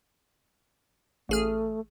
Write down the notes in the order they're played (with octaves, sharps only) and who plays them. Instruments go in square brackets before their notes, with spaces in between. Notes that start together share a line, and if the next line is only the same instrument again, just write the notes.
[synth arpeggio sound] A1 G#4 F6 [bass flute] A3